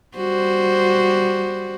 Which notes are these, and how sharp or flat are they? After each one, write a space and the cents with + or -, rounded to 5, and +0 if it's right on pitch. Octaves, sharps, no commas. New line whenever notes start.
G3 +0 F#4 +0 C5 +0